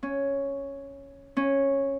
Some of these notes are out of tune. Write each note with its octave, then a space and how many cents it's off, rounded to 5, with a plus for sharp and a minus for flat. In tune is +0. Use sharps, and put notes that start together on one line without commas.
C#4 +0
C#4 -10